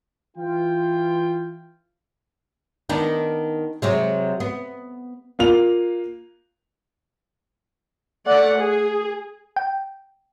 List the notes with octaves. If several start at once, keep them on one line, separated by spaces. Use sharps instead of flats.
E3 F4 G5
D#3 B3 D4
C3 F#3 G#3
B3
A#3 F4 F7
A3 D5 F#5
G#4
G5